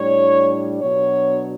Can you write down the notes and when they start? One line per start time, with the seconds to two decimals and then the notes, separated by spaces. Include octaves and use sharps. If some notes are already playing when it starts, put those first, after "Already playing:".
Already playing: A2 G3 D4 C#5
0.81 B2 F#3 B3 D4 C#5